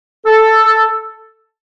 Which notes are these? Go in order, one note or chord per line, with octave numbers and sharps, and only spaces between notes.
A4